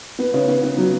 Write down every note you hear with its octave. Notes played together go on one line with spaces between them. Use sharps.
B3
C#3
B3
B3
F#3